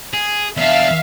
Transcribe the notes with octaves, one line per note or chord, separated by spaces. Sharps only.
G#4
E2 D4 E5 F5